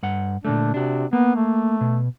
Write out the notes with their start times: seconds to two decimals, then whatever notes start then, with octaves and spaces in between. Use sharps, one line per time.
0.03 G2 F#5
0.45 A#2 D3 A3 D4
0.74 C3 D4 F#4
1.13 A#3 B3
1.36 A3
1.81 B2